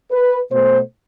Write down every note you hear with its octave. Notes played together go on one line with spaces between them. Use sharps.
B4
B2 A3 C5